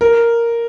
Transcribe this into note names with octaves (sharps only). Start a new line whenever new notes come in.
A#4